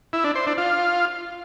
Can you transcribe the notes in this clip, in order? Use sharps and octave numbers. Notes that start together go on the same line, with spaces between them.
E4
D4
C5
D4
F4